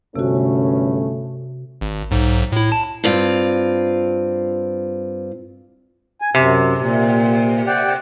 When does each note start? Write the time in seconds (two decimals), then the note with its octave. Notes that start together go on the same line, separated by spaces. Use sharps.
0.16 G1 F#2 C3 A3 B3 C#4 F#4
1.81 G#1
2.11 B1 G#2
2.52 A2 E4
2.72 A5
3.04 G2 C4 F4
6.21 G#5
6.35 F#2 C3
6.77 A#2
7.67 D5 F#5 G5